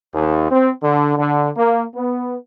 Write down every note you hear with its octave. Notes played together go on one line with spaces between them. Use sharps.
D#2
C4
D3
D3
A#3
B3